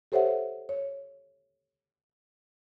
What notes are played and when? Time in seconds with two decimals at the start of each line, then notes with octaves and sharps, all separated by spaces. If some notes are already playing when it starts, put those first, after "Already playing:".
0.12 G4 A4 C5 C#5 E5 F#5
0.69 C#5